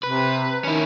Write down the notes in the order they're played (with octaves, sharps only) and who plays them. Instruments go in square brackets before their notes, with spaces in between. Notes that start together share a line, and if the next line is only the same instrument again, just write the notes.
[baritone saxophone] C3 [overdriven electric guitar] B4
[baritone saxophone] D#3 [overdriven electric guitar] C#4 E4